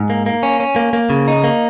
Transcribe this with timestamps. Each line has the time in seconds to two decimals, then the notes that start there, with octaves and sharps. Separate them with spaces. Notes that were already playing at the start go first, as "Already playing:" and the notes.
Already playing: G#2
0.10 A#3
0.26 A#3
0.43 C#4
0.60 C#4
0.76 A#3
0.93 A#3
1.10 C#3
1.28 D#4
1.44 A#3